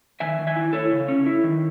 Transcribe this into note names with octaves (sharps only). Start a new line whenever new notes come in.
D#3 E5 G#5
D#3
E5 G#5
E4
E4 A4 C#5
C#3
C#4
E4
D#3